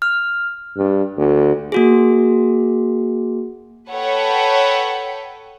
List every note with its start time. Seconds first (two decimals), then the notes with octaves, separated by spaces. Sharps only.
0.02 F6
0.77 G2
1.17 D2
1.72 A#3 F#4 G#4
3.89 A4 B4 C#5 F#5 G5